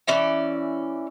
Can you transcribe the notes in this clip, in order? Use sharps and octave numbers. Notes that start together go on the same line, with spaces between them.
E3 C#4 D5 E5